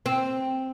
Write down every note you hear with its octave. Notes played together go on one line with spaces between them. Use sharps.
C4